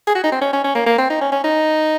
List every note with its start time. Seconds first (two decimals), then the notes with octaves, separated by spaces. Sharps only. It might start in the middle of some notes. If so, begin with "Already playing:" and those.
0.07 G#4
0.15 F#4
0.24 D#4
0.32 C4
0.41 C#4
0.53 C#4
0.64 C#4
0.75 A#3
0.86 A#3
0.98 C4
1.10 D#4
1.21 C#4
1.32 C#4
1.44 D#4